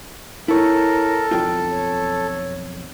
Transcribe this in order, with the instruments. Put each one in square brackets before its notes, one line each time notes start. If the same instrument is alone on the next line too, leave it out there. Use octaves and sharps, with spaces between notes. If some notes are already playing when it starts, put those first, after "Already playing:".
[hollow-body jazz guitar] E4 C#5 [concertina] A4 [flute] A#4
[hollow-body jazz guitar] B1 F2 F4 [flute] G5
[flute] C#5